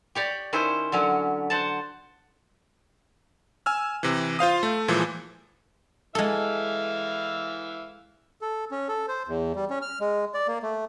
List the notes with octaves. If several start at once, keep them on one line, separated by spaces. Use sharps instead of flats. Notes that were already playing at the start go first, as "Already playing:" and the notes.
G4 C#5 D5
D#3 C#4 E4 C5
D3 F#3 C#4
C5 F#5 A5
G#5 E6 F6
C3 E3
F4 C5 F5 D#6
A3
A#2 E3 F3 G#3
E3 G#3 A4 E5 F5
A4
C#4
A4
C5
E2
G3
C#4
F6
G#3
D5
A#3
A3